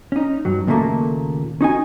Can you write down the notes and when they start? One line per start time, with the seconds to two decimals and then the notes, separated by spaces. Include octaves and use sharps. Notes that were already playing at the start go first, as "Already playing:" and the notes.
0.12 C#4 D#4
0.45 G2 F#3
0.67 D#2 A#2 C#3 A3 A#3
1.61 C#4 D#4 F#4 G#5